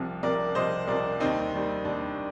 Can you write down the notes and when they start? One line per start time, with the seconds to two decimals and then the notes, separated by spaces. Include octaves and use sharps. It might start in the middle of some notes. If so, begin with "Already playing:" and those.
Already playing: C2 C3 F3
0.23 C2 C3 F3 A#4 D5
0.55 C2 C3 F3 C5 D#5
0.88 C2 C3 F3 A#4 D5
1.20 D#2 D#3 G3 C4 D#4
1.53 D#2 D#3 G3
1.85 D#2 D#3 G3 D4